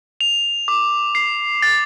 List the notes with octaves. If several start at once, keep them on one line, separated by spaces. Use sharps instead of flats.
F7
D6
C7
A6